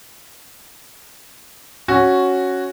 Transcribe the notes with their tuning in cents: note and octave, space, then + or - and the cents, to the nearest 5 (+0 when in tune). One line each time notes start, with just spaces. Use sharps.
C#4 -5 F#4 +0